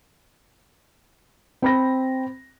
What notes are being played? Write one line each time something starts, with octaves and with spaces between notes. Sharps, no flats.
C4 B5 A#6